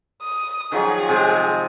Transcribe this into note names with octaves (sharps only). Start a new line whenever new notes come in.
D#6
D#3 F3 F#3 G#4
C3 G#3